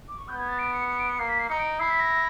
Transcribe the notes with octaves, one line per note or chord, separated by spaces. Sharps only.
D6
C#6
B3 G6
G#6
A6
D7
C#7
C#7
D7
C#7
A#3 C7
B6
C7
D#4 C#7
D7
E4 C7
B6
A#6